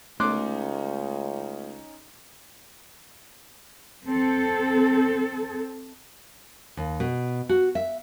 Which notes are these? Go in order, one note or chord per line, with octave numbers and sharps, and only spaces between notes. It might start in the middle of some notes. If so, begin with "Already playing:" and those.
C#2 A3 C#4 D#4 C6 D6 F#6
C4 A4
D#2
B2
F#4
E5